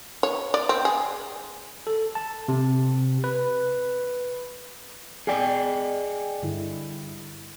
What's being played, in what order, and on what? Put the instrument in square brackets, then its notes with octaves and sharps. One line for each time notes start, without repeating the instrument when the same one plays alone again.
[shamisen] C#5
D5
C4
G#4
[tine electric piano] A4
A5
C3
B4
[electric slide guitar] G#4 D#5 G5 [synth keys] D5 G#5 C#7
[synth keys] G2 D3 E4